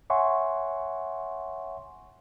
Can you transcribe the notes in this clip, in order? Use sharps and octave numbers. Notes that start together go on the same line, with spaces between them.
C#5 E5 F#5 G#5 C6 C#6